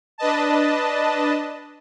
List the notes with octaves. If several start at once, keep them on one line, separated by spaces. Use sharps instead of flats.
D4 B4 D#5 A5